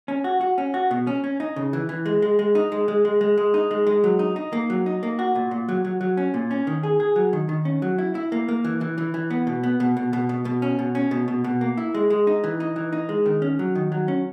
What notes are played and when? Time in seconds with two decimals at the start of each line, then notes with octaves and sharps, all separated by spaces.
0.08 C#4
0.24 F#4
0.41 F#4
0.58 C#4
0.74 F#4
0.91 B2
1.07 C#4
1.24 C#4
1.40 D#4
1.56 C#3
1.73 E3
1.89 E3
2.06 G#3
2.22 G#3
2.39 G#3
2.55 D#4
2.72 G#3
2.88 G#3
3.05 G#3
3.21 G#3
3.37 G#3
3.54 D#4
3.71 G#3
3.87 G#3
4.04 F#3
4.19 D#4
4.36 D#4
4.53 A#3
4.70 F#3
4.86 D#4
5.03 A#3
5.19 F#4
5.35 A#2
5.51 A#2
5.68 F#3
5.85 F#3
6.01 F#3
6.17 C#4
6.34 A#2
6.51 C#4
6.67 D#3
6.83 G#4
7.00 G#4
7.16 F#3
7.33 D#3
7.49 D#3
7.65 C#4
7.82 F#3
7.98 E4
8.15 E4
8.32 A#3
8.49 A#3
8.64 E3
8.81 E3
8.98 E3
9.14 E3
9.30 B3
9.47 B2
9.63 B3
9.80 B2
9.97 B2
10.13 B2
10.29 B2
10.45 B2
10.62 C#4
10.79 B2
10.95 C#4
11.11 B2
11.28 B2
11.44 B2
11.61 A#3
11.77 E4
11.94 G#3
12.10 G#3
12.27 D#4
12.44 E3
12.60 D#4
12.76 E3
12.93 D#4
13.09 G#3
13.26 D#3
13.42 C#4
13.59 F#3
13.75 D#3
13.92 F#3
14.08 C#4